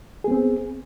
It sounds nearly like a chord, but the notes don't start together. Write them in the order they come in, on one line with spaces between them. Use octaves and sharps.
G#4 B3 C4